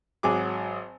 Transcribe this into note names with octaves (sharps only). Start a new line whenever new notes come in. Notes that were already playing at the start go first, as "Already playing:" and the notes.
G#1 F#3 G#4 D6